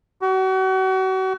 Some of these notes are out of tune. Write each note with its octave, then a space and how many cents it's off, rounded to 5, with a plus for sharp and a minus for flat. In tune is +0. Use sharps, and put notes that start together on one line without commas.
F#4 +35